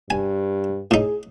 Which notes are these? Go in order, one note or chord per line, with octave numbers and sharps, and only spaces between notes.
G2 G#5
A2 D#4 G#4